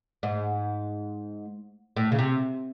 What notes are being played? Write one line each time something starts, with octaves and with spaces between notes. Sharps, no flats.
G#2
A2
C#3
C3